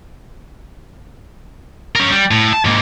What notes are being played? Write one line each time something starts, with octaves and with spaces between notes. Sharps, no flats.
C#4 A#4
G3
A2
A5
G#2 A#3